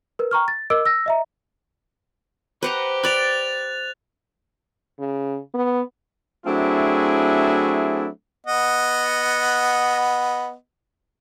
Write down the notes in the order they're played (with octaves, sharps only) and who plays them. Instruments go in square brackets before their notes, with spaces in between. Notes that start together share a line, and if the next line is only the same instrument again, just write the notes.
[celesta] A#4 B4
G5 A#5 C#6 F6
A6
A#4 D#5 D6 E6 D7
E6 A#6
D#5 E5 A#5
[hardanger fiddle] G4 [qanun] B4 F#5 A#5 [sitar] C5
[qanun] D5 B5 [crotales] F#6 A6 F7
[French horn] C#3
B3
[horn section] F#3 A3 C4 D4 E4 G#4
[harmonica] B3 D#5 F#5